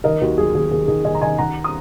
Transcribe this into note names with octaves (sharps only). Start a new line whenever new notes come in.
D#3 A#4 D#5
D#2 F#4 A#4
F#3 G#4
D#2 G#4
D#2 G#4
D#3 G#4
D#3 D#5 G#5
A#5
D#3 D#5 G#5
D#3 F#5 A#5
D#6